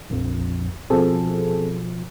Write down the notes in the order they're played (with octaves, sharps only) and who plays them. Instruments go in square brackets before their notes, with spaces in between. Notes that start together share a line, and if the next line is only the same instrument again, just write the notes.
[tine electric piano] A#1 F2
[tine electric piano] B2 F3 [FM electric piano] C4 G#4 A4